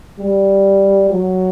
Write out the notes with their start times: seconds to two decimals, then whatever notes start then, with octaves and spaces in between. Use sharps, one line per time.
0.19 G3
1.10 F#3